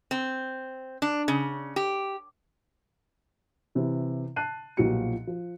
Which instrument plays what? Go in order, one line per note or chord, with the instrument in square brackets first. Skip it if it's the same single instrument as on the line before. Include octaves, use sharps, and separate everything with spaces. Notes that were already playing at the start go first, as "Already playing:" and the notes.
[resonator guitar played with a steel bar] C4
D4
C#3
G4
[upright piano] C3 E3
A5 F#6 C7 D#7
B1 A#2 F3 F#4 G4 C#7
F3